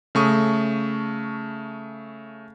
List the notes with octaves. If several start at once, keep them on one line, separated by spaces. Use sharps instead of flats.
C#3 A3 C#6 D#6